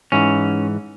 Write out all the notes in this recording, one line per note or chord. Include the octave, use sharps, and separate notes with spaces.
G#2 E3 C#4